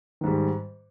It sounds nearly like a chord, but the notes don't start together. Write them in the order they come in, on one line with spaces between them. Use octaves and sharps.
D#3 G#2 G3